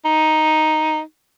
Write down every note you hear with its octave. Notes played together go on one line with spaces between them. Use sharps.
D#4